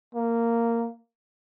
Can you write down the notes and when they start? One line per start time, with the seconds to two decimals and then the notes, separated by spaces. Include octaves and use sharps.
0.15 A#3